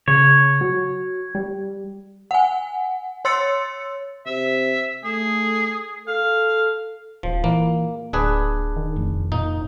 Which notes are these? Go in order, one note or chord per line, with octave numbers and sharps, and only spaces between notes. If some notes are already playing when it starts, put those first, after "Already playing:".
C#3 C#5
F#3
G3
F#5 G#5
C#5 C6 E6 A6 C#7
C3 E5
A3 G#4
A4 F5
D#1 F3
A#2 E3 A#3
D1 D4 G#4 B4
D#3
F1
A#2 D#4